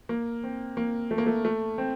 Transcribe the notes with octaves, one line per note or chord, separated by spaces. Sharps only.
A#3
C4
A#3
A3
A#3
A3
A3
C4